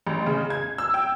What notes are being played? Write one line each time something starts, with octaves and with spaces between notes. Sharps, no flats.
A1
C#3
G#6
E6
G5